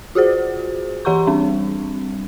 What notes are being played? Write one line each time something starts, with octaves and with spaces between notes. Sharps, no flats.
F4 F#4 G#4 C5
E3 G4 F#5 A#5 C6 C#6
G3 C4 D4